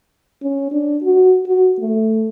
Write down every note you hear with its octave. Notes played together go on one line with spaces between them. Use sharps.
C#4
D4
F#4
F#4
A3